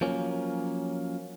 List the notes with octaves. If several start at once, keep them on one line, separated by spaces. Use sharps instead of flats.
F3 F#3 A#3 C#4